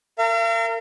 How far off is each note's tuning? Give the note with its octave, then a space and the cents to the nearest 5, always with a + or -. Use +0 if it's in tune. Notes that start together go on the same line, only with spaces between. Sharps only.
A#4 -35 F5 -45